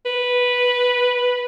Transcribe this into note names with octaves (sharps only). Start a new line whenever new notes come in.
B4